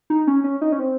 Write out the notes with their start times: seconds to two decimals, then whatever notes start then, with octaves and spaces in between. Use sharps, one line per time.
0.10 D#4
0.27 C#4
0.44 C#4
0.61 D#4
0.72 C#4
0.79 C4